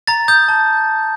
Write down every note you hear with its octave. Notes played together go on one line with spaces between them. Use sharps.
A#5 A6
D#6 G6
A5